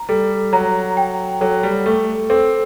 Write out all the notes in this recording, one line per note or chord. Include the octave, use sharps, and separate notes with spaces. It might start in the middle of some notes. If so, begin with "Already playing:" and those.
Already playing: A#5
G3 A4
F#3 A#5
G5
F#3 A4
G3
A3 A4
C4 A4